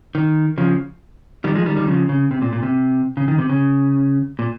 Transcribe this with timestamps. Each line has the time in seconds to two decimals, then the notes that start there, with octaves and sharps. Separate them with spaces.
0.15 D#3
0.58 C#3 F3
1.44 D#3 G3
1.55 F3 G#3
1.66 D#3 G3
1.76 D#3 G3
1.87 C#3 F3
2.09 C#3
2.31 C3
2.42 A#2
2.53 A#2
2.63 C3
3.17 C#3
3.28 D#3
3.38 C3
3.49 C#3
4.39 A#2